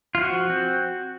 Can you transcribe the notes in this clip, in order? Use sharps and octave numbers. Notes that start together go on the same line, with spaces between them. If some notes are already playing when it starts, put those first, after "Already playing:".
F4
F3 F#4
C4